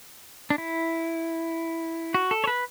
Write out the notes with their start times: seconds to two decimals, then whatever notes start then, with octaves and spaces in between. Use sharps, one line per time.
0.50 D4
0.58 E4
2.14 F#4
2.31 A4
2.44 C#5
2.47 B4